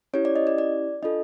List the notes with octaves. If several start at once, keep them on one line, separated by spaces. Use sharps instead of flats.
C#4 E4 G4 C#5
D5
D#5
D5
D5
D4 F4 A4 D#5